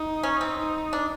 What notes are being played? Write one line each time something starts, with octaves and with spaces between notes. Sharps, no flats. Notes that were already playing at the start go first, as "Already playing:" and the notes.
Already playing: D#4
C#4
C4
D#4
D4